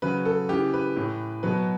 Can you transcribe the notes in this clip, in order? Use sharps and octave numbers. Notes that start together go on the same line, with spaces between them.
C#3 F#3 B4
A4
C#3 E3 G4
B4
A2 E3
B2 F#3 B4